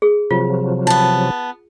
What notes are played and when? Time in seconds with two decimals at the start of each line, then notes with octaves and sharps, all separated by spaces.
0.02 G#4
0.31 C3 F3 F#3 F4
0.87 B3 A5